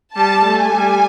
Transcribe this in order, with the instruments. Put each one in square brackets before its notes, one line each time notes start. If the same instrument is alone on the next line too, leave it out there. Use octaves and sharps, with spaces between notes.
[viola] G3 [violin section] A5
[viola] A3
[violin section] G#5
[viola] G3